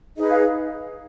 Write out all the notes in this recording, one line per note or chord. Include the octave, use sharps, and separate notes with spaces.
D#4 G#4 B4 D#5
F5